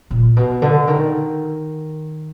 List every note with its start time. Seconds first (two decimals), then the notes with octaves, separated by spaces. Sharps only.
0.11 A#2
0.37 B2
0.62 D3
0.88 D#3